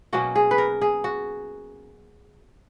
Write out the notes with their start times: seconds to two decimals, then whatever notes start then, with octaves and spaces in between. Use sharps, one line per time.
0.13 B2 F#3 A#3 C#4 F#4
0.36 G#4
0.51 B4
0.58 A#4
0.81 G#4
1.04 F#4